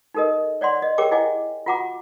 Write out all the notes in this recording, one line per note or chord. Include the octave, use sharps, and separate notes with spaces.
D#4 G4 A4 A#4 D#5
C#5 D5 F#5 C6
D#5
G4 G#4 A#4 C#5 G5 D6
E4 D#5 F#5 G#5 D6
F4 F#4 F#5 A#5 D6